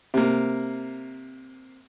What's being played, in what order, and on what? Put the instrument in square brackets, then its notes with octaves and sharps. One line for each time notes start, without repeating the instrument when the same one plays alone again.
[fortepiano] C3 A#3